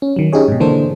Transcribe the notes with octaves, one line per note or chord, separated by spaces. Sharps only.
C#4
D#3 F#3
C#4 D#4 G4 G#4 C#5
G#2 B2
D3 E3 A#3 D4 A4 C5